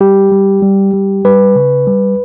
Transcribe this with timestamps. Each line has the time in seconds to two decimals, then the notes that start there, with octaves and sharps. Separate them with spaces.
0.01 G3 G4
0.32 G3
0.62 G3
0.94 G3
1.25 G3 B4
1.56 C#3
1.87 G3